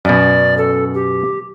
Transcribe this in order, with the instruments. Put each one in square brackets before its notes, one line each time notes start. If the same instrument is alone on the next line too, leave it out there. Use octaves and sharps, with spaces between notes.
[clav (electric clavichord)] F#2 B2 [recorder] D5
[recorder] A4
G4